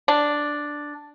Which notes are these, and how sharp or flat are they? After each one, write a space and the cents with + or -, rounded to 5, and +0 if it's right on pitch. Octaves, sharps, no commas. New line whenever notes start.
D4 +0